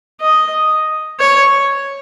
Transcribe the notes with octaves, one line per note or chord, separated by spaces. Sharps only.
D#5
C#5